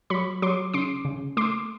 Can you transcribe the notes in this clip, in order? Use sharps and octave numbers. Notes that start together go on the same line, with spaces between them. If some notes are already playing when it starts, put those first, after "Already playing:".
F#3 B5 C#6
F#3 C6 D6
C#3 C6 D6
C#3
A3 C6 D6